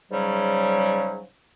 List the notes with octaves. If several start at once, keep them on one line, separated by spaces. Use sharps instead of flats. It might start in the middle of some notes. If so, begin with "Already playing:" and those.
G#2 C#3 F#3 G3